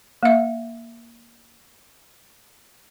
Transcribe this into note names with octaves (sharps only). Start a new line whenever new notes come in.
A#3 E5